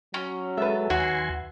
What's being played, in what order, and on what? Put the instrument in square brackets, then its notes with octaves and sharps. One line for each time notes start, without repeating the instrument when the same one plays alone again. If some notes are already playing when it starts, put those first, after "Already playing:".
[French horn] F#3 [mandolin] C#4
[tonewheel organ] G#3 A4 [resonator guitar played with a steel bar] B4 E5
[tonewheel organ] D#2 G#5 C6 [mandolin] F#4